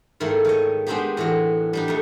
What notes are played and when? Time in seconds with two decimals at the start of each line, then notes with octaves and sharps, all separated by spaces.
0.20 G#2 D#3 A3 A#3 E4
0.45 D#3 C#5 D#5
0.86 G#3 B3 C4 D4 D#4 G4
1.17 A2 E3 D4 F#4
1.73 G3 D4 D#4
1.88 F2 A3